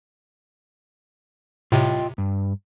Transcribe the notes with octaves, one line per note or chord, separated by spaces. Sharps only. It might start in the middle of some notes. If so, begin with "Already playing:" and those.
A2 C3 F4 D#5 G5
G2